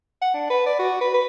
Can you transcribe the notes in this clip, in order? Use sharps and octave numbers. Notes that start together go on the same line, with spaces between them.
F#5
D4
B4
D5
F#4
B4
B4